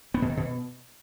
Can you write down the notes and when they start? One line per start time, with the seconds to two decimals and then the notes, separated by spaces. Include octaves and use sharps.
0.14 B3
0.22 B2
0.30 D#3
0.37 B2